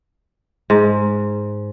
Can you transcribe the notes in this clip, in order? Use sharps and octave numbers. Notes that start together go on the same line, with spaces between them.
G#2